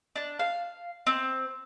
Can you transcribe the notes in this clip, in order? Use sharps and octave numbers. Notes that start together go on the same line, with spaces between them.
D4
F5
C4